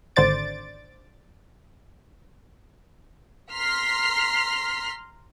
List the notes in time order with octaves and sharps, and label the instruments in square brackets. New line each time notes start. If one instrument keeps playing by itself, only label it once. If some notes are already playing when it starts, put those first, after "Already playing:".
[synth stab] G#1 D3 C5 D5 A6 D7
[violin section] A#5 C6 F6 B6 C7